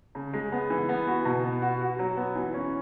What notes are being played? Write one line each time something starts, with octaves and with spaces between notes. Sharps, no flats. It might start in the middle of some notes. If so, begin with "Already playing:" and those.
C#3
G#3
B3
E3
B3
F#4
B2
B3
F#4
F#4
F#3
B3
E3
C#4